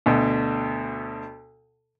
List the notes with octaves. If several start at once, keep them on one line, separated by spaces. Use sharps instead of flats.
D2 B2